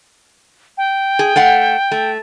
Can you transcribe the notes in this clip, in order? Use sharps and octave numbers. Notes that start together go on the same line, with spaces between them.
G5
G#4
A3 F5 F#5
A3